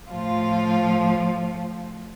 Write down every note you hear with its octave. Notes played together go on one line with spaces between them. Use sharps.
A2 F3 F4